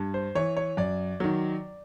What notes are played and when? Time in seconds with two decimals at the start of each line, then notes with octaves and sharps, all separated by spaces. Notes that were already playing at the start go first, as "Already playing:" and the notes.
Already playing: G2
0.14 C5
0.35 E3 C#5
0.57 C#5
0.77 F#2 D5
1.20 D#3 F#3